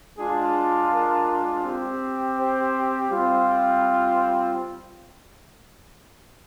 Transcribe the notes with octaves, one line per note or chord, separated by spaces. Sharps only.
G#3 D4 F4 G#4
A#4
C4 G4
C5
G3 C4 F4